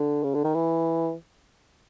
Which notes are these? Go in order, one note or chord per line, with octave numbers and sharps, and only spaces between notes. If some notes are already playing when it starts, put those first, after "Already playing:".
Already playing: D3
C#3
D3
D#3
E3